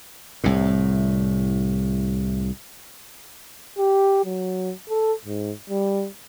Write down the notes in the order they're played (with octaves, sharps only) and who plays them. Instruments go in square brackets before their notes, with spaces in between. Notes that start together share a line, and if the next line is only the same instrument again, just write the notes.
[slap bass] C2 A2
[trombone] G4
F#3
A4
G#2
G3